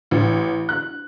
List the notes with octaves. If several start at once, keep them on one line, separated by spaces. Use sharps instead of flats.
A1
F#6